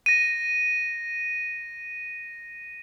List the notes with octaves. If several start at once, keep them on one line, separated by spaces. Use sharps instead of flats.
A#6 D#7